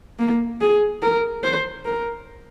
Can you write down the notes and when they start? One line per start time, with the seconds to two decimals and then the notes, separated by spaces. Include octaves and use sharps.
0.19 A#3
0.61 G#4
1.02 A#4
1.44 C5
1.85 A#4